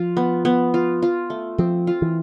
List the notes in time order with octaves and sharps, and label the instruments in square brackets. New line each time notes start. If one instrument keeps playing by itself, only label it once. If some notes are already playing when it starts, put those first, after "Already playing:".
Already playing: [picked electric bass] F3 [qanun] F4
[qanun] B3
B3
F4
F4
A3
[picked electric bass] F3 [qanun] C4
[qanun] F4
[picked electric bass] E3